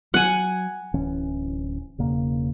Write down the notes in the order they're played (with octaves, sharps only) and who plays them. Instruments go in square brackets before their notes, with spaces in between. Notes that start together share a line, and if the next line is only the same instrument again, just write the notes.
[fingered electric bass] F#3 [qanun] F#5 G#5
[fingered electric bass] D1 E3 C#4
E1 C#3 A#3